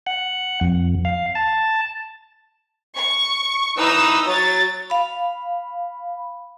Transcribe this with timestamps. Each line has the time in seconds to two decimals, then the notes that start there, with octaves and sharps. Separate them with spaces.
0.07 F#5
0.61 F2
1.05 F5
1.35 A5
2.96 C#6
3.78 E3 D#4 B4 A#5 D#6 E6
4.27 F#3 C#5 A6
4.90 F5 B5